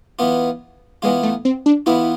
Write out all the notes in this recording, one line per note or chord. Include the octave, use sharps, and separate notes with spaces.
E3 B3 F4
E3 G#3 B3 F4
A3
C4
D4
E3 B3 E4 F4